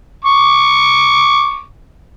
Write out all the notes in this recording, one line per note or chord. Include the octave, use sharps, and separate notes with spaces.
C#6 D6